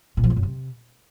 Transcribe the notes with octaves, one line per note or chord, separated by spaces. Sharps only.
A#2
F3
F2
F#2
C3